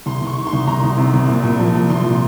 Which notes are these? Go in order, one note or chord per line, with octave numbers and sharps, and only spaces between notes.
C2 C6
C2
C#6
D#3
C6
C2
C2 A#5
C2
C3
C2
A#2
A#2
F3
F3
C2 C6